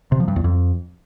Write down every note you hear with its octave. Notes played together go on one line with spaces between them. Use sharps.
C3
F3
G2
E2
F2